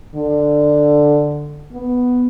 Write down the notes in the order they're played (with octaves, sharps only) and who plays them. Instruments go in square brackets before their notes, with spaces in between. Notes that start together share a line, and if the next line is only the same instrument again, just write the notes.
[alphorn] D3
B3